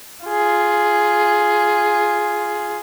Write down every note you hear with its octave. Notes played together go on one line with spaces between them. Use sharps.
F4 G#4